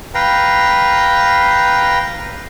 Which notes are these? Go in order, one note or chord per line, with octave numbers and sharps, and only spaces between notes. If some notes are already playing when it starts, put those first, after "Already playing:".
B4 F5 G5 A#5